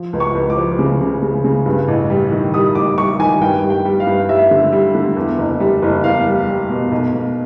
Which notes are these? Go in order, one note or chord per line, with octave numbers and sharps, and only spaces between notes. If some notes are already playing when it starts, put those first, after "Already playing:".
Already playing: F3
C#2
C#6
C#2
D6
F3
C#3
C#3
C#3
C#3
G2
A1
G3
D#3
G3 D#6
A1 D6
G3 C#6
D#3 G#5
G2 G5
G3
G5
G3
F5
G2
G3 E5
D3
G3
D3
E2
F#1
G3
F#1
E2 F5
G3
G3
B2
B1
B2